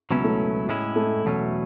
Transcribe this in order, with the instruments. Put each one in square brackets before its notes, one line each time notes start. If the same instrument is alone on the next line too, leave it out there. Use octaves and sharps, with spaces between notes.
[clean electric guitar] C#2 B2 F#3 C#4 E4 [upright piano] B3
[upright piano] A3
[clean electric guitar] A2 G#3 C#4 E4
[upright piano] A3
[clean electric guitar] E2 B2 F#3 A3 C#4